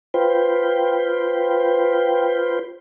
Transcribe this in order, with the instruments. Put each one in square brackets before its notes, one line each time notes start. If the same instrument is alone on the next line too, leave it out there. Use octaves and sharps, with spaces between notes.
[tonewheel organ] F4 B4 C5 G5